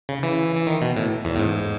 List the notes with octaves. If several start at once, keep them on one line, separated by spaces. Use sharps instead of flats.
C#3
E3
E3
D#3
B2
A2
E2
A2
G#2